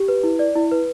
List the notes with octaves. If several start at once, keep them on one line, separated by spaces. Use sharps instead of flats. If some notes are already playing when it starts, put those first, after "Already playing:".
Already playing: G4
B4
E4
D5
E4
B4